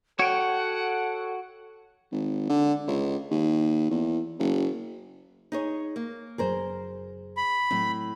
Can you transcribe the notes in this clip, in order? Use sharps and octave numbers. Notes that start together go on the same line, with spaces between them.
F#4 A4 C#5 F#5 G5
G#1
D3
C#2
D#2
E2
F#1
D#4 G#4 C#5
A#3
F#1 F#2 F#3 G#4 A#4 C5
B5
A2 F#3 C4